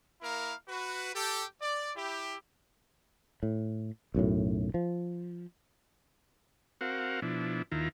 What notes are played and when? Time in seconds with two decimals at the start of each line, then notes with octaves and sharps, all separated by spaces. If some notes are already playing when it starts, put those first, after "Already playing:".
0.22 A#3 E4 A#4 F5
0.68 F#4 B4
1.15 G4 A4
1.60 D5
1.95 E4 G4
3.43 A2
4.14 B1 F#2 A2
4.74 F3
6.81 C4 F#4 A#4 F5 F#5
7.22 B2 F3 D4 E4
7.72 D#2 D#3 E4 F4 A#5